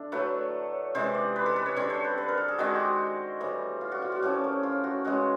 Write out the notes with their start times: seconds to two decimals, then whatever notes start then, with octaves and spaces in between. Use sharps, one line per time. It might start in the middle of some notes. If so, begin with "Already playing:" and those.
Already playing: D3 D4 E5
0.12 A2 F#3 A3 B4
0.95 C3 E3 G#3 C5
1.15 D5
1.36 B4
1.46 A4
1.56 B4
1.66 C#5
1.76 D3 G3 C4 C#5
1.90 C5
2.04 B4
2.18 B4
2.28 A#4
2.37 A4
2.48 G#4
2.58 D#3 G#3 C4 F#4
2.75 F#4 G4
3.41 A2 E3 G3
3.81 F4
3.92 F#4
4.02 F4
4.12 F#4
4.23 A2 F3 A3 C#4 G4
4.44 A#4
4.63 F4
4.84 F#4
5.05 C#3 E3 G#3 F#4